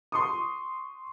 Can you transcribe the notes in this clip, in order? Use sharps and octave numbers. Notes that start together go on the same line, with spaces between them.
C6 C#6 D#6